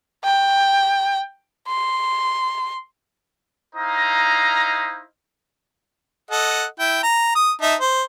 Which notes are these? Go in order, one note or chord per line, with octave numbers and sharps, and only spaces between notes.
G5
C6
D#4 E4 C5 D#5 F5 A#5
A4 D#5 F#5
E4 G5
A#5
D#6
D#4 E5 A5
C5